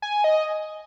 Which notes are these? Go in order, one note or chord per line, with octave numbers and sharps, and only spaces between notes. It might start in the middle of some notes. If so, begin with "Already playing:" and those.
G#5
D#5